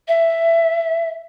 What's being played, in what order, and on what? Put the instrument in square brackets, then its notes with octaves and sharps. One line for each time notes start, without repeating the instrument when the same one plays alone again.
[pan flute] E5